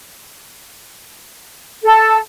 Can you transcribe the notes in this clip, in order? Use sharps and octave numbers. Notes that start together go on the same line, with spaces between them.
A4